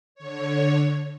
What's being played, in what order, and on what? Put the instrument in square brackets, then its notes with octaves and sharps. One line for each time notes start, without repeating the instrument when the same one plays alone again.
[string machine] D3 C#5